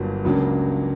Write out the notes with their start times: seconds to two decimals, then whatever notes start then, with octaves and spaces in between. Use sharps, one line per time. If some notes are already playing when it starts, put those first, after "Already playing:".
Already playing: G1 G2 F#3 A#3
0.25 C#2 C#3 F#3 A#3 D4